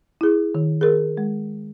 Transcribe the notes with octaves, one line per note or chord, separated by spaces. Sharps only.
E4 G#4
D#3
G#4 A#4
G#3